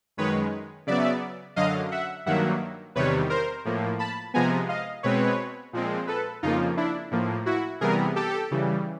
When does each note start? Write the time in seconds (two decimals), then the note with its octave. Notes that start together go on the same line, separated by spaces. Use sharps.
0.17 F#2 D#3 G#3 B4 C#5
0.87 C#3 F#3 B3 D5 E5
1.56 F#2 D3 F#3 D#5 F5
1.91 E5 F#5
2.26 G2 D#3 F#3 A#3 E5 F#5
2.95 E2 C3 D#3 G3 B4 C#5
3.30 A#4 C5
3.65 A2 F3 A#3
3.99 A5 B5
4.34 C3 F3 G#3 B3 G#5 A#5
4.69 D#5 F5
5.03 B2 G#3 C4 B4 C#5
5.73 A#2 F3 G#3 C4
6.07 A4 B4
6.43 F2 C#3 F3 A#3 D#4 F4
6.77 D4 E4
7.11 A2 F3 A#3
7.46 E4 F#4
7.81 C3 E3 G3 B3 G#4 A#4
8.16 G4 A4
8.51 C#3 E3 G3